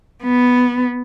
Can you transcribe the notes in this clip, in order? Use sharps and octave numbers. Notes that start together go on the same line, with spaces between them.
B3